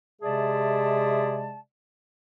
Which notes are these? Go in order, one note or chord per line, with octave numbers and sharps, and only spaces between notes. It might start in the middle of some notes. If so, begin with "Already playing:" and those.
C3 G#3 G#4 D5 E5 A5